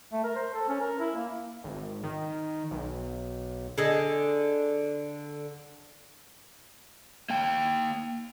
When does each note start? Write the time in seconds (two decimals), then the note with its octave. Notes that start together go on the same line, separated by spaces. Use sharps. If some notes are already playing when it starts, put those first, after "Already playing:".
0.12 A3
0.24 A#4
0.36 C5
0.54 A4
0.68 C#4
0.80 A#4
0.99 E4
1.16 A#3
1.64 G#1
2.04 D#3
2.71 B1
3.78 D3 G#4 D#5
7.30 A#3 G5